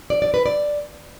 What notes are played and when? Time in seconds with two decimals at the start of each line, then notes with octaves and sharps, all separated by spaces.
0.10 D5
0.22 D5
0.34 B4
0.46 D5